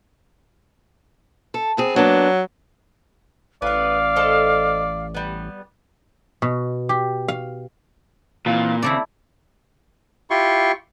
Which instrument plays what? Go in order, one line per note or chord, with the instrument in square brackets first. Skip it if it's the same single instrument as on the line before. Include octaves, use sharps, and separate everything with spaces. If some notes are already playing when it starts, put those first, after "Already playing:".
[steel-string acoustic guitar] A4
B3 C4 G#4
[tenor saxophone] F#3 [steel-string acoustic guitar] A#3 B3 D4
[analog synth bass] A1 [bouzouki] B3 B4 [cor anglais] D5 [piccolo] F5
[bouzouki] A4 C5 D#5
G3 B3
[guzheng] B2
G4
F5
[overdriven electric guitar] A#2 [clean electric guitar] E3 C4 F4
[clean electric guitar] D#2 C#3 C4 [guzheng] E4 A4 D5
[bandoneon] E4 F4 G4 C6 C#6